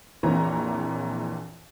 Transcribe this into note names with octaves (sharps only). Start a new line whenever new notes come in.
A#1 F2 A#2 E3 C#5 A#5